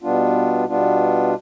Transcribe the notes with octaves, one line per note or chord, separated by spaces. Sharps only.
B2 G3 B3 D4 F4
B2 G3 B3 D4 F4